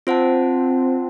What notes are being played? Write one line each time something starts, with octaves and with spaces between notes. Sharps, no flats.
C4 F4 C5 F#5 A5